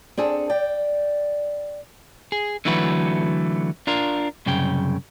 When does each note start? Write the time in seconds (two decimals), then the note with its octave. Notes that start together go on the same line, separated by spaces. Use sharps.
0.17 C4 D4 G#4 A4
0.49 D5 G5
2.32 G#4
2.65 D3 E3 F#3 A3 F#4 B4
3.87 D4 F4 A#4
4.46 C2 F#2 C#3 G5